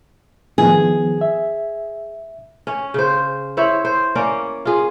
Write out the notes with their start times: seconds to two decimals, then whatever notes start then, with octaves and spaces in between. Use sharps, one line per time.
0.58 D#3 F3 B3 G#4
1.21 E5
2.67 C#4
2.94 C#3 C5
3.57 E4 C5 C#5 E5
3.85 C5
4.15 A#3 C#4 D5
4.65 F4 G#4